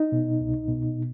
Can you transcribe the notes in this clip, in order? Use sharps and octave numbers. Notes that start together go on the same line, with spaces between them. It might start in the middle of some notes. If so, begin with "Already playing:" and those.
Already playing: D#4
B2
C2
B2